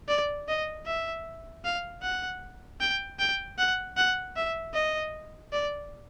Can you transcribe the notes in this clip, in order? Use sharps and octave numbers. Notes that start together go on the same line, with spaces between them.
D5
D#5
E5
F5
F#5
G5
G5
F#5
F#5
E5
D#5
D5